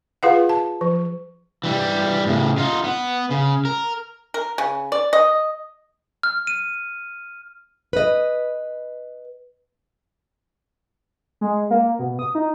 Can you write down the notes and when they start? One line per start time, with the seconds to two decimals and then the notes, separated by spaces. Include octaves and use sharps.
0.23 F4 G#4 B4 F5 F#5
0.49 A5
0.81 F3
1.64 E3 G3
2.26 A2 C#3
2.58 D#4 F4
2.84 B3
3.31 C#3
3.65 A#4
4.34 A#4
4.58 C#3
4.92 D5
5.13 D#5
6.23 F6
6.47 D#7
7.93 B4 D#5
11.41 G#3
11.71 A#3
11.99 B2
12.19 D#6
12.35 D#4